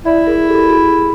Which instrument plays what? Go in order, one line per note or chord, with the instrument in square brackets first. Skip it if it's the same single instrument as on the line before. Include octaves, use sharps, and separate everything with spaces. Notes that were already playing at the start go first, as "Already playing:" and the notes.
[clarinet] E4 [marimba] D5 E5
[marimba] G#4 A#4
G4 A4
F#4 G#4